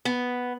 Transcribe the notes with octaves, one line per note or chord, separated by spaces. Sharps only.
B3